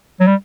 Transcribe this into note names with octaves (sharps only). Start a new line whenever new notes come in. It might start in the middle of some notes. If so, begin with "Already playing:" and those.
F#3
G3